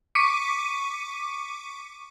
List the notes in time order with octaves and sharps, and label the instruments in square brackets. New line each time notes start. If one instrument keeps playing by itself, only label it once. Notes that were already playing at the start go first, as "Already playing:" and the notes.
[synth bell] C#6 D6 B6 C#7 D#7